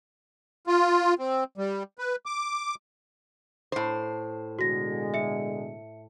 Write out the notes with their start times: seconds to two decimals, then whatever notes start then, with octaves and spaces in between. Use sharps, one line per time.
0.67 F4
1.19 C4
1.58 G3
1.98 B4
2.26 D6
3.72 A2 C5
4.59 B2 D3 G#3 F#4 A#6
5.14 E5 C#7